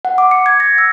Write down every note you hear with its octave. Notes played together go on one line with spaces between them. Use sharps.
F#5
D6
C#7
G#6
A#6
E6